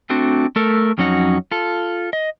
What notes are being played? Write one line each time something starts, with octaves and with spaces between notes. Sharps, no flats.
A3 C4 D4 F#4
A3 A4 A#4
F2 F#3 C#4 D#4 F#4
F4 A4
D#5